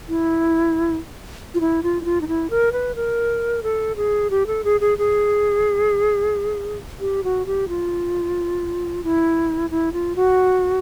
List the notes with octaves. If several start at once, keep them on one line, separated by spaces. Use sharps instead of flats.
E4
F4
E4
F4
E4
F4
D#4
E4
A#4
B4
A#4
A4
G#4
G4
A4
G#4
G#4
G#4
G4
F#4
G4
F4
E4
E4
F4
F#4